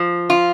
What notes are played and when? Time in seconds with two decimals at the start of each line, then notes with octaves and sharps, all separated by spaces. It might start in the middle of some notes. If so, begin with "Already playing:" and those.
Already playing: F3
0.30 F4